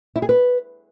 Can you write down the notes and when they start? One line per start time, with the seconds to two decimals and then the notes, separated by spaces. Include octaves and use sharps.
0.16 E4
0.22 G#4
0.29 B4